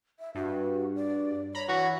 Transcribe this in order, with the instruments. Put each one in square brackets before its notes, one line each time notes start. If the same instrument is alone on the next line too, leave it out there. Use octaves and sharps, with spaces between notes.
[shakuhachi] E5
[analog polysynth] G2 [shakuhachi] F#4
[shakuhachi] D5
[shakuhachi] C#5 [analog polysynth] A#5 B5
[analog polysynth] E3 [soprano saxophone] F#4